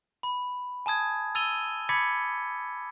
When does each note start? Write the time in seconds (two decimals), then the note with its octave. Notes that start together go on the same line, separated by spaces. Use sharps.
0.23 B5
0.86 G#5 A5 D#6 G#6
1.35 E6 A6 D#7 F7 G7
1.89 B5 D6 G#6 A6 B6 C#7